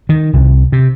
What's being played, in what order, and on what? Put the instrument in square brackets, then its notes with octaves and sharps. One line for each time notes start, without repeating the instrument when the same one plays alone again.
[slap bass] D#3
C2
C3